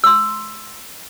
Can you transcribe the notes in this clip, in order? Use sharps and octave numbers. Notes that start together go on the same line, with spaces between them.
C6 E6